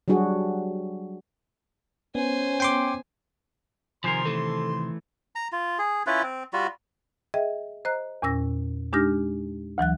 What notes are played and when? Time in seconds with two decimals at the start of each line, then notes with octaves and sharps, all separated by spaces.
0.08 F#3 G3 D4 F#4 G#4
2.15 B3 C#4 C5 G#5
2.60 G5 C6 D6
4.04 C3 D#3 F3 A#4 C5 G#5 C6
4.25 E3 A3 A4
5.35 A#5
5.52 F4
5.78 G#4
6.07 C#4 E4 F4 B4
6.23 C4
6.53 G3 F4 F#4
7.34 G#4 D#5 E5 G5
7.85 C5 D#5 A#5 F#6
8.22 E2 A#2 C#4 E6 A#6
8.93 G#3 D4 D#4 G4 F6 A#6
9.78 D2 E3 F#3 F#6